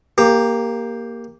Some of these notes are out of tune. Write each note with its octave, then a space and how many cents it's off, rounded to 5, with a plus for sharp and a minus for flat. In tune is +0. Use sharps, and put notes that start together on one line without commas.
A#3 +0 G4 +15